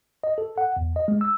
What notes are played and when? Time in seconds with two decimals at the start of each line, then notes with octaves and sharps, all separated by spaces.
0.24 D#5
0.38 A4
0.58 F#5
0.77 E2
0.96 D#5
1.08 G#3
1.21 E6